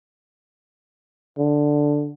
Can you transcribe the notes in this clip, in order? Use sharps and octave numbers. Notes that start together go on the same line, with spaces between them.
D3